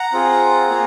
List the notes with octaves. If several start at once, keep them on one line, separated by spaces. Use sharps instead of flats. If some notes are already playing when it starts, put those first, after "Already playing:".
Already playing: F#5 A#5
C4 F4 G#4
A#3 F4 G#4